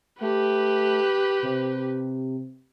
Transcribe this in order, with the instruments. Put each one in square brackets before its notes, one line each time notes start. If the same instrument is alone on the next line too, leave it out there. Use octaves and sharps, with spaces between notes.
[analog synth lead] A3 [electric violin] G4 B4
[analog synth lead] C3